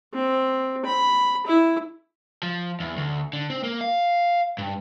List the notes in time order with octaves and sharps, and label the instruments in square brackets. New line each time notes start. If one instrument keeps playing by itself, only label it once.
[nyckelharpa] C4
B5
E4
[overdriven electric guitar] F3
E2
D2
D3
C4
A#3
F5
G2